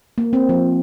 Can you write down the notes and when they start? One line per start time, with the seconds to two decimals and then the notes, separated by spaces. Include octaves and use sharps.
0.18 A#3
0.33 C4
0.49 F3